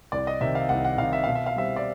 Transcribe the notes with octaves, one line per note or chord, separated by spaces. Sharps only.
C2 D5
D#5
C3 D#3 E5
F5
C2 F#5
F#5
C3 D#3 F5
E5
B2 F5
E5
F5
G3 C4 E5
D5